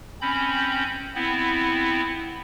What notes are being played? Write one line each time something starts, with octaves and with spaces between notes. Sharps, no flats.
C4 C#4 B5 G6
B3 C4 E4